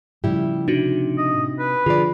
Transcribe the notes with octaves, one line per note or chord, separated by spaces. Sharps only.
A2 C#3 F3 G3 E4 G4
C3 D4 D#4 F#4
D#5
B4
D3 F3 F4 G#4 D5